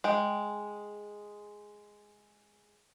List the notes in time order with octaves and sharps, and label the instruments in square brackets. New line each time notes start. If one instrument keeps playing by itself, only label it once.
[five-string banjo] G#3 G5